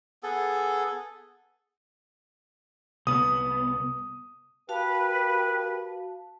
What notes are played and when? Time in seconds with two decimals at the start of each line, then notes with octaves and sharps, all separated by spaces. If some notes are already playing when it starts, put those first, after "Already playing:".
0.23 B3 G#4 A4
3.07 C2 B3 D#6
4.69 F#4 G4 A#4 B4 F5 A5